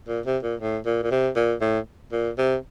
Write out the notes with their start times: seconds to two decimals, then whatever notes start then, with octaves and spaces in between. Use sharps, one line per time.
0.08 A#2
0.26 C3
0.43 A#2
0.60 A2
0.86 A#2
1.03 A#2
1.11 C3
1.36 A#2
1.61 A2
2.12 A#2
2.38 C3